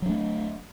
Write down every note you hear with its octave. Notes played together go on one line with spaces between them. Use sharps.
F#3 A3 D4